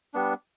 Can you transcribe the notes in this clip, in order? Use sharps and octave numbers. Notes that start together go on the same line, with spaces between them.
G3 B3 D4